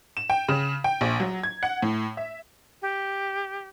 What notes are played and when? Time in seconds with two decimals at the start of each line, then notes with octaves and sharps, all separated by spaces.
0.17 E7
0.30 G5
0.49 C#3
0.84 G5
1.01 A#1
1.20 F#3
1.43 G#6
1.63 F#5
1.82 A2
2.17 E5
2.82 G4